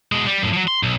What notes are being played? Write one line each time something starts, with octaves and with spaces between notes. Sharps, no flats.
B2 G#3
G3
F#2 A2
F3 F#3
C6
B1